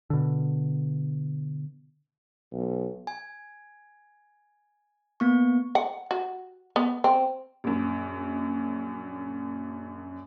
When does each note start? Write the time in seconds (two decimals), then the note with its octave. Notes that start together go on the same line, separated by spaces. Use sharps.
0.10 B2 D3
2.52 B1
3.07 G#5
5.20 A#3 B3 C#6
5.75 F#5
6.11 F#4
6.76 B3
7.04 C4
7.64 A#1 F#2